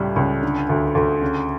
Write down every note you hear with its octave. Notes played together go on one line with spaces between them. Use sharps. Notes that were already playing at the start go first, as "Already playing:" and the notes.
Already playing: C#2 A2 G3
C#2
D3
D2
D2
C#3